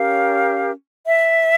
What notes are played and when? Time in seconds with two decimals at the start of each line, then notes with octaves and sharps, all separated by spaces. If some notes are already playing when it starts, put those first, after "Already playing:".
Already playing: C#4 G4 A#4 F5
1.07 E5